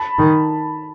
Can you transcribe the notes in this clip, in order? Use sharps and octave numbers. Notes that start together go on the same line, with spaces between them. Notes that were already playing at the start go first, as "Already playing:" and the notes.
Already playing: A5 B5
D#3